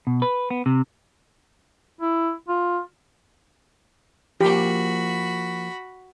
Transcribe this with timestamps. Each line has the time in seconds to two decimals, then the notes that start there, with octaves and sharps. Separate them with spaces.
0.07 B2
0.22 B4
0.50 B3
0.66 C3
2.01 E4
2.48 F4
4.41 F3 A#3 F#4 G4 B5